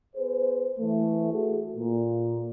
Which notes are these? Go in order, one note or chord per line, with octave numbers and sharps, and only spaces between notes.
B3 G#4 B4 C5
E3 A3
F#4 G#4 A4
A#2